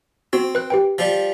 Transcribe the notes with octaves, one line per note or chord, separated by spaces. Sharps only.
C4 F#4
B4 F#6
G4 B4 G5
F3 G3